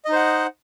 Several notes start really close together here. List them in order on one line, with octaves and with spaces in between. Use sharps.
D#5 D#4 C5 F#5